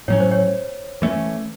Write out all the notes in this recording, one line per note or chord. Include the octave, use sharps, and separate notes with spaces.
A2 F#3 C#4 C#5
C5
C#5
E3 A3 C#4